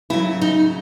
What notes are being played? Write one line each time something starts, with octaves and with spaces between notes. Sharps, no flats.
C#3 F#3 E4
D#4